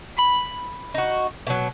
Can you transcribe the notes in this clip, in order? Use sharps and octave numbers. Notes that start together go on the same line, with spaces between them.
B5
D#4 F#4
B2 F#3